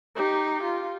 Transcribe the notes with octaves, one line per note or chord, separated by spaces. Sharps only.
D#4 G4
F4